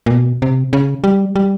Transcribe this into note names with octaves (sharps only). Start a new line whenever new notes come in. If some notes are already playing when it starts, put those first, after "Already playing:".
A#2
B2
C3
C#3
G3
G3